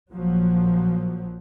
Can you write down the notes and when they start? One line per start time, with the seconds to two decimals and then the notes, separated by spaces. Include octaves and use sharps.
0.12 A#1 F3 F#3